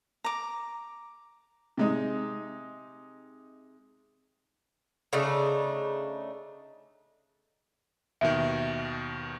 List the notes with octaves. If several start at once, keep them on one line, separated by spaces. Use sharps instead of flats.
A#5 D6
C3 G#3 D#4
C#3 A3 D4 D#4
D#2 B2 D#3 E5